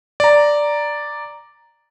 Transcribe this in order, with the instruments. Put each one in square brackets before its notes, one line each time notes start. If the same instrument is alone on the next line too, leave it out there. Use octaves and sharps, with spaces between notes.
[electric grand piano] D5 A#5